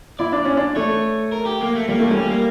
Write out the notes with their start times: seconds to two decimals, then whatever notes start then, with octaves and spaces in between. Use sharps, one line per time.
0.19 E4 D5
0.32 D4
0.45 C#4
0.57 D4
0.76 A3 C#5
1.32 A#4
1.46 G4
1.61 A#3
1.75 A3
1.88 G3 A#3
1.99 A3
2.08 G3 C#4
2.27 A#3